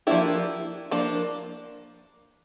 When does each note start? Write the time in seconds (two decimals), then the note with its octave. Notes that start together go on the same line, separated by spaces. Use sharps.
0.07 F3 A#3 D4 E4 G4
0.91 F3 A#3 D4